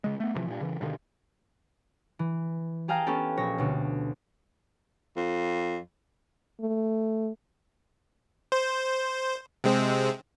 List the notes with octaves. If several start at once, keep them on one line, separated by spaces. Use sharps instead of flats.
C#3 G#3
A3 B3
A1 C3 E3 F3
G2 A#2
C#3 E3
G2 B2 D3 D#3
E3
G4 G#4 F5 G5 A5 A#5
B3 C#4 G4 A4
A#1 C#5 A#6
D2 B2
F2
A3
C5
C3 G#3 C4